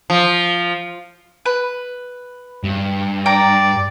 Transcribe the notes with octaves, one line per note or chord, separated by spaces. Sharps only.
F3
B4
G2
D5 G5 A#5